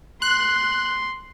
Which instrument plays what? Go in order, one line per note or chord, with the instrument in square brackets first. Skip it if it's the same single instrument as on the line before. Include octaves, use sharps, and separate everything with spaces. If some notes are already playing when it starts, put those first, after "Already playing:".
[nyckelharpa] C6 [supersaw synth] F#6